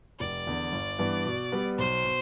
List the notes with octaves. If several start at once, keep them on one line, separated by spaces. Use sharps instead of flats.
F1 D5
E2 D3
G1
G2 E3 B3
B2
G3 B3
B1 C5
B2